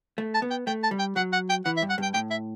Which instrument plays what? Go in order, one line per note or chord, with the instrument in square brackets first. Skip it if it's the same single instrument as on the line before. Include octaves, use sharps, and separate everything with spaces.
[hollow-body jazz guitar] A3
[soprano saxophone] A5
[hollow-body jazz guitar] B3
[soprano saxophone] G5
[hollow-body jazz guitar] A3 [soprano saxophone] G5
[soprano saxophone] A5
[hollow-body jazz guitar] G3
[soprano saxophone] G5
[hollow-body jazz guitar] F#3 [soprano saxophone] F#5
[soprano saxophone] F#5
G5
[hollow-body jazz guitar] E3 [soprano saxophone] F#5
[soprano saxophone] E5
[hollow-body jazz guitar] G2
[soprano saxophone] F#5
[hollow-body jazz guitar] G2 [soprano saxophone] G5
[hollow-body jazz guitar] A2 [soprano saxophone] G5
[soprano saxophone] E5